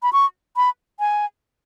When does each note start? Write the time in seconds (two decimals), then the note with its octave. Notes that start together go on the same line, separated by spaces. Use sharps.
0.03 B5
0.13 C#6
0.56 B5
1.00 G#5